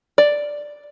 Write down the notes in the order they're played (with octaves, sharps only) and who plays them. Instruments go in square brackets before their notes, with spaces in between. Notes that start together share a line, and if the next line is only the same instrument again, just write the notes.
[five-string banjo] D5